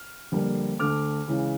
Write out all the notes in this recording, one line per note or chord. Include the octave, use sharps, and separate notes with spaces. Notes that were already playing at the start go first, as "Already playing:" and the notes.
Already playing: F6
F2 D3 G3 A#3
D2 D3 A3 D6 F6
C#2 C#3 E3